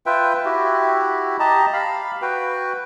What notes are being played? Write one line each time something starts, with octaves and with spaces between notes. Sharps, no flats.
F4 B4 E5 G5
E4 F#4 G4
G4 D#5 A5 A#5
F5 B5
F#4 B4 G5